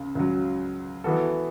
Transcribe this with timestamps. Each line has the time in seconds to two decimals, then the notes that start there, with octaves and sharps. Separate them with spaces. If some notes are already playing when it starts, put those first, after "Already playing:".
Already playing: C#2 C#3
0.15 C#2 C#3 F#3
1.04 E3 B3 F#4 A4